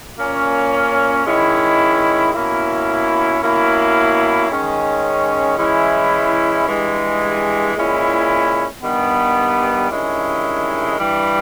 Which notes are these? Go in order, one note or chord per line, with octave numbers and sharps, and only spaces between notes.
A#2 A#3 C#4
D#3 G#3 C#4 E4
B2 A#3 C#4 E4
B2 A#3 C#4 E4
D#3 G#3 C#4
E3 G#3 C#4 E4
G2 E3 G#3
A#2 G#3 C#4 E4
G2 D#3 G3 B3
G2 D#3 G#3 C#4 E4
G2 E3 G3